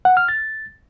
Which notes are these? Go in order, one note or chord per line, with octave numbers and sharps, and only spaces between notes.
F#5
F6
A6